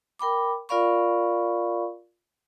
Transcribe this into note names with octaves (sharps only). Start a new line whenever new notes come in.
A#4 G5 B5 D6
F4 A#4 D5 F5 B5 C#6